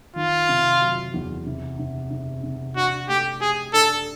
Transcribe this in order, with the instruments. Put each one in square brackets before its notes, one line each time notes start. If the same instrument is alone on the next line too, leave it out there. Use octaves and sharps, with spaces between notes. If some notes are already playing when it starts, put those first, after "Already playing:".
[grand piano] D#3 [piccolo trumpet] F4
[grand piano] C3
F#3
E2
C3
C3
C3
C3
[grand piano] D4 [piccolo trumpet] F#4
[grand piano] A3 [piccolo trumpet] G4
[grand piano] G4 [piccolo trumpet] G#4
[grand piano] D4 [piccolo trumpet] A4